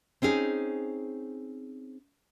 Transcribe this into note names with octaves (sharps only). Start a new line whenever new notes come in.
C4 C#4 D#4 G#4